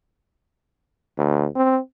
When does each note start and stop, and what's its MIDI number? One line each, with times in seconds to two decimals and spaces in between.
1.18 1.47 38
1.55 1.79 60